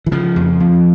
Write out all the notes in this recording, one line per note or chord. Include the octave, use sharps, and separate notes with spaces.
E3
C#3 F3
F2
F2